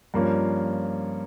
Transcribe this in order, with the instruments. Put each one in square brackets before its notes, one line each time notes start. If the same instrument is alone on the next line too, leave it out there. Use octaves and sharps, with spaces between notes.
[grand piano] G2 F3 A#3 C#4 F4